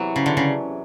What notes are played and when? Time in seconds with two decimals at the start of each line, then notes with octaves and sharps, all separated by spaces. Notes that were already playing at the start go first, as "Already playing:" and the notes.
Already playing: E2 C3 E3 F#3
0.16 C#3
0.26 D3
0.37 C#3